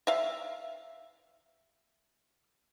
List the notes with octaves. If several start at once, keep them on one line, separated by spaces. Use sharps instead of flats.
E5 F5